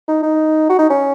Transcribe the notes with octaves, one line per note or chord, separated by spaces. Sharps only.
D#4
D#4
F#4
D#4
C#4